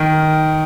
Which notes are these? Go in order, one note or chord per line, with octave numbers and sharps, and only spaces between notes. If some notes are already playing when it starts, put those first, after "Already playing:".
Already playing: D#3